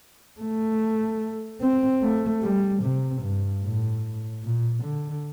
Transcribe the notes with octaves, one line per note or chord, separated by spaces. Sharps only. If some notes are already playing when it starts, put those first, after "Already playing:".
A3
C4
A3
G3
C3
G2
A2
A#2
D3